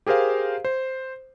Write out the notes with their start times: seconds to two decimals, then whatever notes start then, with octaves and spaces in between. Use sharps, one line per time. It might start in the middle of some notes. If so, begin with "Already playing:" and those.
0.07 G4 G#4 A#4 C5 F5
0.65 C5